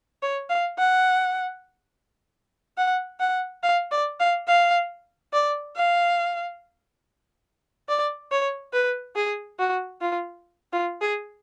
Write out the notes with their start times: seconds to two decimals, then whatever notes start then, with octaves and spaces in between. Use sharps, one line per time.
0.22 C#5
0.50 F5
0.79 F#5
2.77 F#5
3.20 F#5
3.63 F5
3.91 D5
4.20 F5
4.48 F5
5.33 D5
5.76 F5
7.89 D5
8.31 C#5
8.73 B4
9.16 G#4
9.59 F#4
10.01 F4
10.73 F4
11.01 G#4